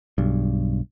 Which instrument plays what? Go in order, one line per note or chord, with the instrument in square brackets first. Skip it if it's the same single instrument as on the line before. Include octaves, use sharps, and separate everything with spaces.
[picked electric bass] B1 G2